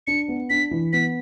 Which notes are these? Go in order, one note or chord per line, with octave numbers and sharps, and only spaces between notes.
D4 C#7
B3
D4 B6
E3
B3 B6